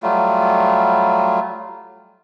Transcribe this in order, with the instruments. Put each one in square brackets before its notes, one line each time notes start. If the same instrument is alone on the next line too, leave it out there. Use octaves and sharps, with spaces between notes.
[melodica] F#3 G3 A3 F4